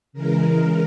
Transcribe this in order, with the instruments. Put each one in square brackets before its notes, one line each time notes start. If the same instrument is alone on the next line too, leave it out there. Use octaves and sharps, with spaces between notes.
[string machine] C#3 E3 G#3 A#4